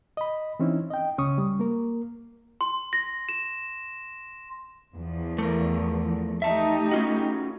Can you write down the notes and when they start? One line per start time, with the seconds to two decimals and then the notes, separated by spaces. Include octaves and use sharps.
0.17 D#5 B5
0.59 E3 C4 C#4 D#4 E4
0.90 D#5 G5
1.18 C#2 C#3 C#4 C#6 D#6
1.38 G3
1.60 A#3 A#4
2.61 C6
2.93 A#6
3.29 E7
4.94 E2 F3
5.38 A3 A#4
6.42 A3 D#4 G4 E5 A5
6.91 C#4 F4 F#4